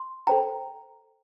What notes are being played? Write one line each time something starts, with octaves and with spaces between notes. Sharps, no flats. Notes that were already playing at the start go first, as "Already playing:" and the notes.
Already playing: C6
A4 C5 G5 A#5